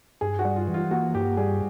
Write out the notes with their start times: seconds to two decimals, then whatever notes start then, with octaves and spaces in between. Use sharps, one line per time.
0.21 G2 G#4
0.39 F#4
0.45 G3
0.56 F4
0.68 E3
0.74 F4
0.91 A#3 F#4
1.15 G2 G4
1.37 G3 G#4